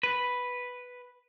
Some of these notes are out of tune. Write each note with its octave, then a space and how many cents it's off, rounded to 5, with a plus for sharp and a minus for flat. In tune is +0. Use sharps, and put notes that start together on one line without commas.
B4 +0